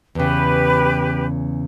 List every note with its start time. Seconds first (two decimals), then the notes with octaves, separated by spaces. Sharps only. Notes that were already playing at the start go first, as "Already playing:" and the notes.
0.15 E2 C#3 G4 B4